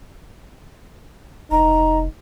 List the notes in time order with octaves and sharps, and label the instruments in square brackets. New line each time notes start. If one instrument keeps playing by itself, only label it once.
[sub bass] F1 [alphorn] D#4 [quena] A#5